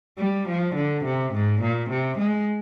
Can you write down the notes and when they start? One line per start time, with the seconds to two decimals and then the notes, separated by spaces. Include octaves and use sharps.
0.18 G3
0.48 F3
0.75 D3
1.05 C3
1.34 G#2
1.62 A#2
1.91 C3
2.18 G#3